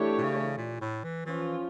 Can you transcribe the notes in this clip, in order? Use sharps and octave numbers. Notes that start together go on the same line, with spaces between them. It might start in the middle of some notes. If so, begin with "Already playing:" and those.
Already playing: E3 A3 D4 G4 C#5
A#2
C#3
A#2
A2
E3
E3 F3 C#4 F4